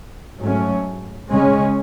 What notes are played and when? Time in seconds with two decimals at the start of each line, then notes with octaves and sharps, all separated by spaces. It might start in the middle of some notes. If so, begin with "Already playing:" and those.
0.38 G#2 F#3 A3 C#4
1.29 C#3 G#3 C#4